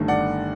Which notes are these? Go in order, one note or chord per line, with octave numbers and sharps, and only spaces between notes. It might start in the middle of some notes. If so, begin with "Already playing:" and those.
Already playing: G1 G2 D#3 A3
D5 F#5